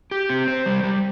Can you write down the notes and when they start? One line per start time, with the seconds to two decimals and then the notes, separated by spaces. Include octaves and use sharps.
0.11 G4
0.29 C4
0.48 C5
0.66 G3
0.84 G3